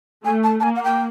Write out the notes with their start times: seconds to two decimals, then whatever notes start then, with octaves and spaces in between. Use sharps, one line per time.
0.25 A3 G#5
0.44 A5
0.60 A5
0.63 A#3 G#5
0.76 F#5
0.84 G5